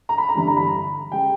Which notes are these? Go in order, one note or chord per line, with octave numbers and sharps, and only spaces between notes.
A#5
B5
A#5
G1 G2 E3 B5
A#5
B5
A#5
C#3 G3 C#4 G5